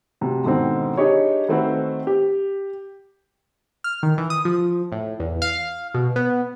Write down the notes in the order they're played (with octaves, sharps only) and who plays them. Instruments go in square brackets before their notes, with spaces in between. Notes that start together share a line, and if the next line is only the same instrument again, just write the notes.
[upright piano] D2 C3
G#2 B2 D3 D#3 C4
D4 D#4 G4 G#4 C#5
D#3 A3 C4 F#4 B4 C5
G4
[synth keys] F6
D#3
E3
D#6
F3
A2
E2
F5
B2
B3